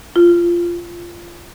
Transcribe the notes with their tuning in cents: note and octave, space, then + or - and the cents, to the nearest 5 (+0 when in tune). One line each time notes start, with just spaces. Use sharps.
F4 -15